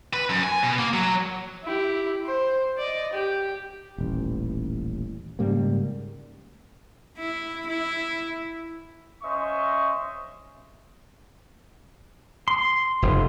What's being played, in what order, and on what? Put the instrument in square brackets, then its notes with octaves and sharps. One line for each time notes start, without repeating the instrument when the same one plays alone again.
[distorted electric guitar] B4
F#2
G#5
B2
A#3
F#3
[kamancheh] E4 G4
C5
D5 D#5
G4
[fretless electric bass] D#1 A1
G#2 C#3 G3 A#3
[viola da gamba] E4
E4
[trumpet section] C#4 C5 D#5 E5 C#6
[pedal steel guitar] C6
[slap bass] F1